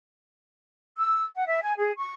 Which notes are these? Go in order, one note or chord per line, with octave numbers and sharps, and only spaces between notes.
E6
F#5
E5
G#5
G#4
C#6